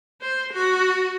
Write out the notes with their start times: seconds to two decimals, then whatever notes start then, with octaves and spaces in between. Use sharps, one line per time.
0.21 C5
0.53 F#4